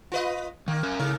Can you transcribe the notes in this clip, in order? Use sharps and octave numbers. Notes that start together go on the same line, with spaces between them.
F4 B4 D#5
D#3 A#3
C#4 A#4
G#2 C#3 A#4